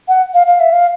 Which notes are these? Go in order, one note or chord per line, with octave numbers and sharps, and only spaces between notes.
F#5
F5
F5
E5
F5